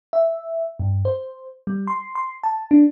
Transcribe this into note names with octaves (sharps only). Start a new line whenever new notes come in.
E5
G2
C5
G3
C6
C6
A5
D4